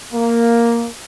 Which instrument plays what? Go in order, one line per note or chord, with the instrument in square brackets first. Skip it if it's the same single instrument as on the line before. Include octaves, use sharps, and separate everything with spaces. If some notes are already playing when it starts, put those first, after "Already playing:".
[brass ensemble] A#3